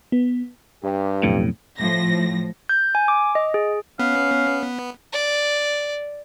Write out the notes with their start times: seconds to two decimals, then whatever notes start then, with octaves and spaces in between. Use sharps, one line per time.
0.12 B3
0.83 G2 G4
1.23 B1 F2 A2
1.79 A2 F3 A#6
2.69 G6
2.95 G#5
3.08 D6
3.35 D#5
3.54 G#4
3.99 B3 C#4 F5
5.13 D5